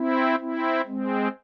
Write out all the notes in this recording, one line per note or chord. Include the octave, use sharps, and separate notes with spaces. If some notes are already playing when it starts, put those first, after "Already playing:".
Already playing: C4 E4
C4 E4
G#3 C4